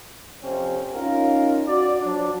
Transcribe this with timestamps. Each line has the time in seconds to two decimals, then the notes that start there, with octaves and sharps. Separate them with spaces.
0.43 F2 C3 C4 C#4
0.95 C#4 D#4 F4 A#4
1.67 F#4 D5
2.01 F3 F#3 D4